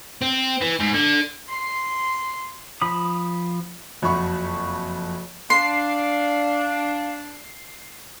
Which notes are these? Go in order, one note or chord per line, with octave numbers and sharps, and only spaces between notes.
C4
E3
G#2
D3
C6
F3 B5 D#6
F#1 F2 F#4 E5 B5 C#6
D4 F5 C6 C7